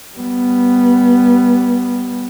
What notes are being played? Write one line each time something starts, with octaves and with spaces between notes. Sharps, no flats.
G3 B3